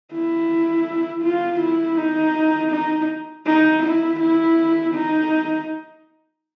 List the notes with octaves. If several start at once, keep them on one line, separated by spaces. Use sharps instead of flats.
E4
F4
E4
D#4
D#4
D#4
E4
E4
D#4